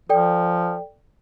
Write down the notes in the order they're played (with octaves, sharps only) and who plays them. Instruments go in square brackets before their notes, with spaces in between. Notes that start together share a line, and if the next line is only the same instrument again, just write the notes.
[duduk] F3 [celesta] A4 D5 G5